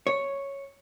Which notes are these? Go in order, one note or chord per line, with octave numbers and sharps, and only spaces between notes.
C#5